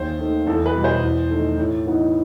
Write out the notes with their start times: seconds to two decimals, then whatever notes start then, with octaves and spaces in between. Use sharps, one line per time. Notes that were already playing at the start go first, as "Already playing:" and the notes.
Already playing: D#2 C5
0.20 D#3 A3
0.47 E2 A4
0.66 B4
0.75 B2 G3
0.84 C5
1.03 E2
1.30 D#3 A3 D#4
1.58 A2
1.86 E3 B3 D#4